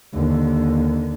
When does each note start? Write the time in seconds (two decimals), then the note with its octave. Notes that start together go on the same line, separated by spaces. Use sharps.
0.13 D#2 D3